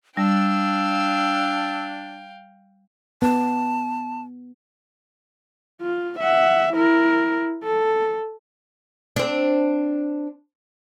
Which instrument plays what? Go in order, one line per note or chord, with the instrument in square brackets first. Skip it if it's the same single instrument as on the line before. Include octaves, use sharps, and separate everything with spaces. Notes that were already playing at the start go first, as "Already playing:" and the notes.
[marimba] G3 [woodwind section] D4 [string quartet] F5 G5 [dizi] E6
[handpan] B3 [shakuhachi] A5
[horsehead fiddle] F4
E5 F#5
E4 A#4
A4
[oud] C4 D4